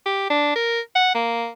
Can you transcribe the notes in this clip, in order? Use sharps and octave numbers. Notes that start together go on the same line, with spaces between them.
G4
D4
A#4
F#5
A#3